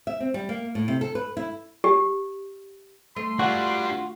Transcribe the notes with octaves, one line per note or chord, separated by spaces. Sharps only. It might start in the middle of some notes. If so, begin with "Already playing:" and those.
E5
C4
G3
A#3
A2
C3
A4
B4
E4
G4
A3 C6
G3 D4 F4 F#4 E5